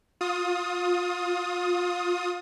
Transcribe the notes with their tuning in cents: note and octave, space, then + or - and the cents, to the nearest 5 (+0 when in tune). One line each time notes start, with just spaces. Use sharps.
F4 +25 D#6 +15